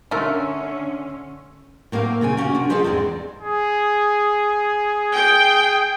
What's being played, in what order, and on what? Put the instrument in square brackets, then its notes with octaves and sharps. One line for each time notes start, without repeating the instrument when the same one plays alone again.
[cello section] D3 C#4 [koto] A3 [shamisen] D#4 A#4 [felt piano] C6 E6 F6
[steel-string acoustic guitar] A2 A#3 C4 A4 F5
A#2 C#3 C4 G#5
A#3 C#4 F#4 G#5
C3 D4
F4 G#4 A4 B4 C5 D#5
E2 G#2 G#3 C4 D5
[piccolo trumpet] G#4
[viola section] G5